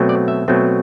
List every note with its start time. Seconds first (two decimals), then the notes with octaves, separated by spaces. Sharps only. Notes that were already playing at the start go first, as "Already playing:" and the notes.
Already playing: B2 F#3 A3 C4
0.09 D5
0.28 E5
0.48 B2 F#3 A3 C4